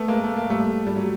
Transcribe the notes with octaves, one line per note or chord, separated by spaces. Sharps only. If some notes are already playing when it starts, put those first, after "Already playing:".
Already playing: A3 B3
G#3 A#3
A3
A#3
G3 A3
G3
F#3